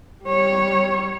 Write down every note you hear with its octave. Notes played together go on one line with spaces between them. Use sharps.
G3 C#5